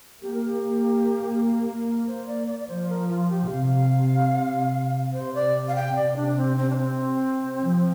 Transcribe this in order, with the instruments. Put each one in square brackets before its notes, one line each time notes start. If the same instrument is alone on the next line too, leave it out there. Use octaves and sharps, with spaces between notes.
[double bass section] A#3 [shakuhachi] G4
[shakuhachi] A#4
G4
A#4
C5
D5
D5
D5
[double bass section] F3 [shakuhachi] C5
[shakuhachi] A#4
F4
G4
[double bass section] C3 [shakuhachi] F5
[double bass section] C3 [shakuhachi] C5
[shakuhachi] D5
F5
G5
[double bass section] C3 [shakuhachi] D5
[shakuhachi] D4
D4
C4
C4
D4
C4
[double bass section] F3